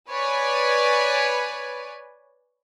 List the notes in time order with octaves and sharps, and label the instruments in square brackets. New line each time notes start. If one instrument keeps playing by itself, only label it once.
[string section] B4 C#5 D5 G#5